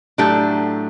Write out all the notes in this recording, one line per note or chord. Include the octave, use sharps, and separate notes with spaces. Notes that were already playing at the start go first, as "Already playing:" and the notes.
A2 F#3 A3 D4 G4